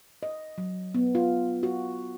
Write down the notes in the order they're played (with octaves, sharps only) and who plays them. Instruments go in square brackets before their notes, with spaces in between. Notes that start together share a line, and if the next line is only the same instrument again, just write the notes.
[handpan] D#5
F#3
B3
F4
F#4